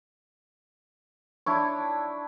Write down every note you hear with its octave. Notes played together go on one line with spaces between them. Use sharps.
D4 E4 C#5